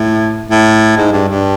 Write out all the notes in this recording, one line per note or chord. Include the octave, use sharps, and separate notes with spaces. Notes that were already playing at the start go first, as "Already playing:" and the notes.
Already playing: A2
A2
G#2
G2
G2